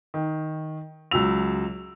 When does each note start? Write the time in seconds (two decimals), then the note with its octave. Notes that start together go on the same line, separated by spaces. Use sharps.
0.14 D#3
1.11 C#2 F#3 E6 F7